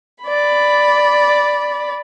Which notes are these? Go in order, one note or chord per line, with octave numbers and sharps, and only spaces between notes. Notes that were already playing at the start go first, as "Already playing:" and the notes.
D5 B5